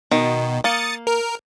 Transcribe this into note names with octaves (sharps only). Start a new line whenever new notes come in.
B2 D#3
A#3 D#6 A6 C#7
A#4